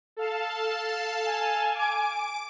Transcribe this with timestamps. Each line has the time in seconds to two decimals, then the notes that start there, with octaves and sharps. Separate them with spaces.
0.17 A4 F5 A5
1.25 G#5
1.75 D6 D7